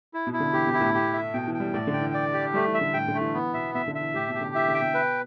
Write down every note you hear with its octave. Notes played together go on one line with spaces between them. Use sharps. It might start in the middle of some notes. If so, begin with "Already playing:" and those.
E4
B2
E4
D3
E3 G4
B2
E4
A2
G4
E5
B2 G5
E3
G5
G3
A2 D5
D3
G5
E3
D5
G4
G3 A3
E3
E5
D3
A2 G5
D3
A3
E3
E3 B3
B2 E5
B2 E5
D3
E5
E3
A2 G4
B2
G4
D3
E3 E5
D3
G5
B2
B4